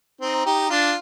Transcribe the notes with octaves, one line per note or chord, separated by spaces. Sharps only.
C4 D#4
D#4 G4
D4 F4